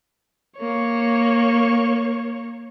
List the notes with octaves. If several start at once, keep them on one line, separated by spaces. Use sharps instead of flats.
A#3 C#5